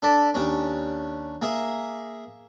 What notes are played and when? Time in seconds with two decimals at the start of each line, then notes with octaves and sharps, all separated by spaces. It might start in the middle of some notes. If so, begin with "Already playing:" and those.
0.02 D4 A4 D5 A5 B5
0.34 D#2 C#4 D4
1.42 A#3 G#4 E5